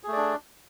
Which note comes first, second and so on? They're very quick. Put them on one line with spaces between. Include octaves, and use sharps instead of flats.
G#4 A3 D5 D4